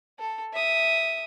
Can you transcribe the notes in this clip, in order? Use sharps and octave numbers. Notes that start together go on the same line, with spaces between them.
A4
E5 D#6